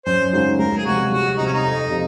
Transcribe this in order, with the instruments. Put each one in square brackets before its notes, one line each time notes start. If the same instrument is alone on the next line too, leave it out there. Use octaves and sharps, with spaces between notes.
[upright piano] F#2 [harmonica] C5
[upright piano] C#3 G#3 D#4 F#4 [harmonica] C5
[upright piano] C#2 [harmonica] A#4
[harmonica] G#4
[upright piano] C3 F3 G#3 [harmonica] F#4
[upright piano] C2 [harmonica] F#4
[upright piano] C3 F3 [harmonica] D#4
[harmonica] C#4
D#4
[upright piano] F2
C3 F3